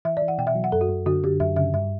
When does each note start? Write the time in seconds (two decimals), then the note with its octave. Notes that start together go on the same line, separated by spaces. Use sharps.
0.05 E3 E5
0.17 D5
0.22 E3
0.28 F#5
0.38 B2 G5
0.47 E5
0.55 F#3
0.64 F#5
0.72 F#2 A4
0.81 F#4
0.89 F#2
1.06 D3 F#4
1.24 D3 G4
1.40 F#2 E5
1.56 C#3 E5
1.73 G2 E5